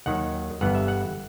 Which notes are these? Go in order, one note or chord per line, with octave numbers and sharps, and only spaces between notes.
D#2 D#3 F#3 F#5
G1 G2 E3 B3 F#5
E5
F#5